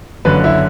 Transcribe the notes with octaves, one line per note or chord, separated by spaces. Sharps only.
F#1 F#2 D3 B4
E4 E5